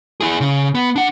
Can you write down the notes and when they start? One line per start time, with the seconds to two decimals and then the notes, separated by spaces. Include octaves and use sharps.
0.21 E4 G#4
0.41 C#3
0.75 B3
0.96 D4 F#5